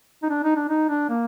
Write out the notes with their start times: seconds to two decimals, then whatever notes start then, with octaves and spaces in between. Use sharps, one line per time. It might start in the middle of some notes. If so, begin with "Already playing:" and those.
0.23 D#4
0.30 D4
0.44 D#4
0.56 D4
0.69 D#4
0.89 D4
1.09 A#3